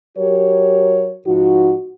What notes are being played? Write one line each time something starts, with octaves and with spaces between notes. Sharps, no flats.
F#3 F#4 G4 A#4 C#5
G#2 F3 D#4 F#4